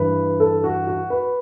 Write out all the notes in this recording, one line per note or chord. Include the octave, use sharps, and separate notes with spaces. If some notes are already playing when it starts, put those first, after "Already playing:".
Already playing: G2 E3 B4
A4
F#4
F#4
B4